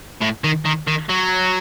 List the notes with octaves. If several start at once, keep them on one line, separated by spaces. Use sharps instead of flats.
A2
D#3
D#3
D#3
F#3